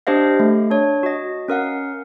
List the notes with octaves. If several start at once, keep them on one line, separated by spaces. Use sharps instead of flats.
D4 G4 C5 D#5 F5
A3
D4 C#5
F#4 D#5
C#4 A#4 F5 F#5